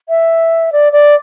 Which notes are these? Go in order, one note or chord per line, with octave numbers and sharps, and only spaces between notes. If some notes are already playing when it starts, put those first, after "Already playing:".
E5
D5
D5